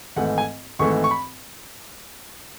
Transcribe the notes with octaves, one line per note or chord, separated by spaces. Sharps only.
G#1 G#2 E3 A3 F#5
G#5
G#1 G#2 E3 A3 C#6
C#6
B5